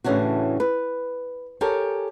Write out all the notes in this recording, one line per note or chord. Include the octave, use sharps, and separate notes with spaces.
A2 C#3 E3 C#4 D4 F#4
B4
G4 A4 A#4 C#5 G#5